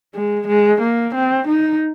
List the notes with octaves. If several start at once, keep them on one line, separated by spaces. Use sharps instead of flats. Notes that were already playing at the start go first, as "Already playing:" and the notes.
G#3
G#3
A#3
C4
D#4